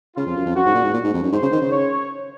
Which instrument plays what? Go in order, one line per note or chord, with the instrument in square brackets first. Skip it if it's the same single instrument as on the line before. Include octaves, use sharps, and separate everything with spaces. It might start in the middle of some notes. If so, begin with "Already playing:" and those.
[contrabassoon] C#3 [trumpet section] F4
[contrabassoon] F2
F#2
F2
[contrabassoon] F#2 [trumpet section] F#4
[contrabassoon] G#2
A#2
G#2
A#2
G#2
F2
F#2
[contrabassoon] G#2 [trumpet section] C5
[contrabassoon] C#3
D#3
C#3
[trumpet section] C#5